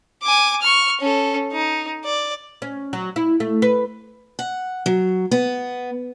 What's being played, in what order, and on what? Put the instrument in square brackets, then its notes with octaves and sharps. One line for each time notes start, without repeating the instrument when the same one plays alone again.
[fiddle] G#5 D6
C#6 F6
C#4 A4
D#4
D5
[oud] C#4
F#3
E4
A3
B4
[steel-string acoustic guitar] F#5
F#3
B3